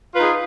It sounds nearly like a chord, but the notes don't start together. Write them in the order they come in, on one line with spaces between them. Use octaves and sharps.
F4 B4 D#4 G#4